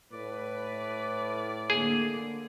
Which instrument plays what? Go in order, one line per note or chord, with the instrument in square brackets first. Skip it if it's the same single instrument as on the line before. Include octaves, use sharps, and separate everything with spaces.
[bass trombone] A2 [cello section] B4 [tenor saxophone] D5
[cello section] D3 A#3 [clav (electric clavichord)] G#4